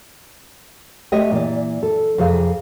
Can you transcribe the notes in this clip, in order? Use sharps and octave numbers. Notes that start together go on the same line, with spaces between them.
A3 G4 D#5 E5 G5
A#2 E3 D5
A4
F2 C3 G#4 F5